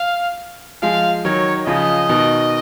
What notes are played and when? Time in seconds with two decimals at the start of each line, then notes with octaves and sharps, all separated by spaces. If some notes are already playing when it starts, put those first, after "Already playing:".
Already playing: F5
0.82 F3 G#3 F5
1.25 D#3 F#3 C#5
1.67 C#3 F3 D#5
2.09 B2 D#3